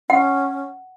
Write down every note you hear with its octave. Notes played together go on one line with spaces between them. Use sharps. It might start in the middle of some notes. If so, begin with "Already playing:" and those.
C#4 F#5